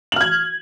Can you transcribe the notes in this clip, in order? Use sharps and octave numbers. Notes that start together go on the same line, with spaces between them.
F6 G#6 F#7